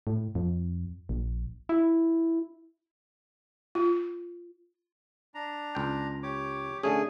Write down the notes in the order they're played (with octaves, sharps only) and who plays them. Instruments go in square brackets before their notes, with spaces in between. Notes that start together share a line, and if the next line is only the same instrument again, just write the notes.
[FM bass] A2
F2
A#1
E4
[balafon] F4
[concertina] D4 A#5
[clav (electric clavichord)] C#2 G5
[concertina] G4 C#5 D6
[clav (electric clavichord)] D3 A3 C#4 [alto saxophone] G#4